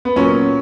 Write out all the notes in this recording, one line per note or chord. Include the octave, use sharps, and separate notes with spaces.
B3
A#2 F#3 C#4